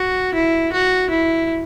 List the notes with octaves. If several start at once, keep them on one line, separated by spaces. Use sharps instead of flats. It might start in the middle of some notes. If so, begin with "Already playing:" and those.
Already playing: F#4
E4
F#4
E4